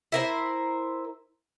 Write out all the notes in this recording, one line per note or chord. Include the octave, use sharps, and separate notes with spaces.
E4 A#4 C5